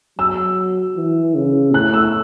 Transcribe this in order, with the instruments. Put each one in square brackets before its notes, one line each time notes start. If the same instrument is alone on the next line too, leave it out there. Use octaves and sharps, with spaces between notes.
[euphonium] F#3 [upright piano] E6
[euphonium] E3
C#3
[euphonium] A2 [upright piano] F#6
[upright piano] E6